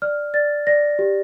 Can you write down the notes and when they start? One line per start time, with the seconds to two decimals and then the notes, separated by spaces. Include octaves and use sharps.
0.02 D5 F6
0.34 D5 A6
0.67 D5 A#6
0.99 G4